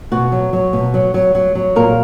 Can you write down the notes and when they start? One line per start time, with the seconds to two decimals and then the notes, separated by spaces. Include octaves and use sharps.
0.12 B2 F#4
0.32 F#3
0.53 F#3
0.73 B2
0.94 F#3
1.14 F#3
1.35 F#3
1.55 F#3
1.76 A#2 A#4